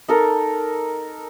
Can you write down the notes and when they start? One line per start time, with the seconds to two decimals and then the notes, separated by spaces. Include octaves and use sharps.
0.08 D#4 A4 A#4